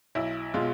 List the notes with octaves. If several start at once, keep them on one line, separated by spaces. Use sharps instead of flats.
B1 E4
B2 G#3 F4